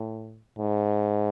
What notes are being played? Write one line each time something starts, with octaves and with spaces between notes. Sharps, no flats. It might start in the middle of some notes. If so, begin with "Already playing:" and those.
Already playing: A2
G#2